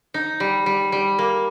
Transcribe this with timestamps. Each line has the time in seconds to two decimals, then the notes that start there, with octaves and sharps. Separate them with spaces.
0.14 D#4
0.40 G3
0.66 G3
0.92 G3
1.19 A#3